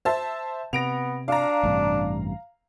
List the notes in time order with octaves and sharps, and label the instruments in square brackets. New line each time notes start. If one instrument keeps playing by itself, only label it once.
[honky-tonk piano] C5 E5 A5
[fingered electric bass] C3 [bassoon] B3 [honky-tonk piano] A#6 D7 F7
[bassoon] D4 [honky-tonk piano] F5 A#5
[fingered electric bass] A1 G2 C3